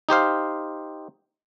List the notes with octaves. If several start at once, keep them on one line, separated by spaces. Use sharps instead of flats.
D#4 G4 C5 F5